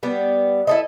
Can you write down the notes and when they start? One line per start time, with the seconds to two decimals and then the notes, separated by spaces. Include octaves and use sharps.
0.03 G3 B3
0.67 E4 A4 D#5